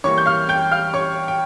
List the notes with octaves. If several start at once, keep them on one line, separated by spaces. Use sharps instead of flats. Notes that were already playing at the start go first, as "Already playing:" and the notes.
E3 G3 A#3 C#5 C#6
G6
F5 F6
G5 G6
F5 F6
C#5 C#6
G5